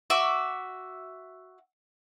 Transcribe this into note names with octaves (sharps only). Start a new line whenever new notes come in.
F#4 E5 D6